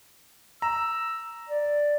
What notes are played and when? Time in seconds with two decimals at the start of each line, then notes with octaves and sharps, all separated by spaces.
0.62 A#5 E6
1.49 D5